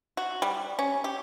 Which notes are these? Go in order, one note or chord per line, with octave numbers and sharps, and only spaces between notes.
F#4
G3
C#4
G4